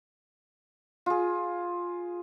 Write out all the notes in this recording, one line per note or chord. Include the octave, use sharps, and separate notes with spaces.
F4 G#4